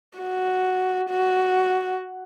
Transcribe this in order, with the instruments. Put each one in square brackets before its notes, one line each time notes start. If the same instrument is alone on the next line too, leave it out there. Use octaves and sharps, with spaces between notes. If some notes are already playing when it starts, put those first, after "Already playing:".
[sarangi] F#4
F#4